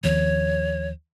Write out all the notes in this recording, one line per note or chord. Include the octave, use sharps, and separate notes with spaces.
D#2 D#3 F3 C#5